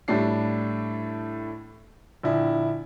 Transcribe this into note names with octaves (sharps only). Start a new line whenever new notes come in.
A2 G3 A3 D4 C7
A#1 D3 E4